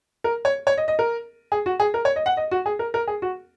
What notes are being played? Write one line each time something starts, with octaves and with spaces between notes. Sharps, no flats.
A#4
C#5
C#5
D#5
D#5
A#4
G#4
F#4
G#4
A#4
C#5
D#5
F#5
D#5
F#4
G#4
A#4
A#4
G#4
F#4